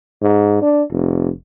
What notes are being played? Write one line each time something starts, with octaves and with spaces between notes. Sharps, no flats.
G#2
D4
F1